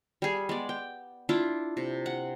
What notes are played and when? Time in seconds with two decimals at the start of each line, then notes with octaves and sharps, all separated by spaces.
0.22 G3 G#4
0.49 G#3 B3 D5
0.69 G5
1.29 D4 E4 F4
1.77 C3
2.06 F#5